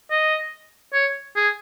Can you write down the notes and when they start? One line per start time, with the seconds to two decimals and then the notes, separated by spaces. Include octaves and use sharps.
0.11 D#5
0.94 C#5
1.36 G#4